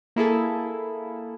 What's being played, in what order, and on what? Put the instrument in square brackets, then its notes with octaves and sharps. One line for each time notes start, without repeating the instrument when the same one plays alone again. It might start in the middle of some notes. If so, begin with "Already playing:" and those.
[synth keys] A#3 E4 G#4 A4